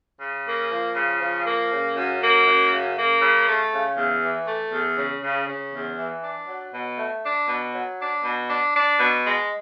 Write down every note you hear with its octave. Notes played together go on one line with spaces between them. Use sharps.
C#3
A#3
F3
C#3
F3
A#3
C#3
F#2
A#3
F#2
C#3
A#3
C#3
A3
C#3
E2
E3
A3
E2
C#3
C#3
C#3
E2
E3
D4
F#3
B2
A3
D4
B2
F#3
D4
B2
D4
D4
B2
G#3